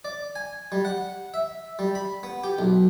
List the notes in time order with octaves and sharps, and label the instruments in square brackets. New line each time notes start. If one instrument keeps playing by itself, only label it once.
[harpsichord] D5
G#5
G3
F#5
E5
G3
B5
B3
G4
B1